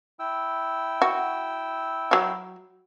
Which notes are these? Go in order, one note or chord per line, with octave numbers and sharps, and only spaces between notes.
E4 G5 E6
F#4
F#3 F#4